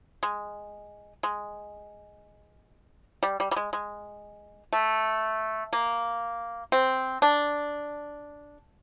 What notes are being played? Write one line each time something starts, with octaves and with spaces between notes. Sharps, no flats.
G#3
G#3
G3
G3
G3
G#3
G#3
A3
A#3
C4
D4